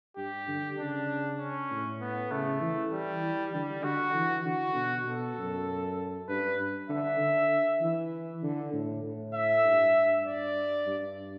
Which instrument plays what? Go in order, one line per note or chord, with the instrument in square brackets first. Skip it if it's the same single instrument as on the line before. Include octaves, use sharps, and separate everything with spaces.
[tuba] G2 [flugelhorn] G4
[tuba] D3
[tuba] C#3 [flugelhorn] D4
[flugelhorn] C#4
[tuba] A2
[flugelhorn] B3
[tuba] C#3 [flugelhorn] A3
[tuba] E3
[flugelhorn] G3
[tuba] E3
[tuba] D3 [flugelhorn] G3
[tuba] D3 [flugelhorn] F#4
[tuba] E3
[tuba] D3 [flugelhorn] F#4
[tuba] B2
[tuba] B2 [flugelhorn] A4
[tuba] F#2
[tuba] G2 [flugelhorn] B4
[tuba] D3 [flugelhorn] E5
[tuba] D3
E3
D3
A2
A2
[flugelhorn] E5
[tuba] G2
[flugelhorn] D5
[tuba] G2